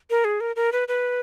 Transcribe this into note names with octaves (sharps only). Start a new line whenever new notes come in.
A#4
G#4
A#4
A#4
B4
B4